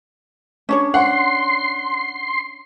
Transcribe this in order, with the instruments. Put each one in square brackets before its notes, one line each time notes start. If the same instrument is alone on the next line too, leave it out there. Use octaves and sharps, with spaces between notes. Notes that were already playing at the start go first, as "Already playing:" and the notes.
[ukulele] C#4 D4 C#5
[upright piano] F#5 [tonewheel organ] C6